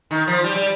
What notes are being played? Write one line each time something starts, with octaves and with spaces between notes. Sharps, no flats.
D#3
F3
G3
G3